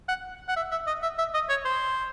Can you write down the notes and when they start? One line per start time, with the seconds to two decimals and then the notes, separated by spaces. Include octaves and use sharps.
0.09 F#5
0.49 F#5
0.57 E5
0.71 E5
0.87 D#5
1.03 E5
1.19 E5
1.34 D#5
1.50 C#5
1.65 C5